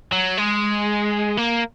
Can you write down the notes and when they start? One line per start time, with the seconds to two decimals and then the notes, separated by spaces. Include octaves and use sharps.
0.12 F#3
0.37 G#3
1.37 A#3